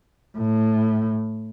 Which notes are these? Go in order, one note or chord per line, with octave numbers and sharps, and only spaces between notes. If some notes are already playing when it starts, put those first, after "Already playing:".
A2